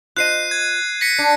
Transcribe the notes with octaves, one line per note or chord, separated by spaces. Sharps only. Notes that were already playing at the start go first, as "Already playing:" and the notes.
F4 C5 D#5 F#6 C7 D#7
G#6
A#6 B6 C#7
D4